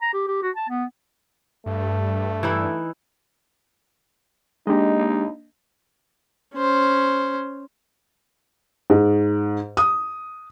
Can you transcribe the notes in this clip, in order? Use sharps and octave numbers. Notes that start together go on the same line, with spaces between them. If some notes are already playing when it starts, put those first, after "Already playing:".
A#5
G4
G4
F#4
A5
B3
G2 A3
E3 D#4 E4
G#3 A#3 D4 D#4 G4 D#5
C#4 C5
G#2
D#6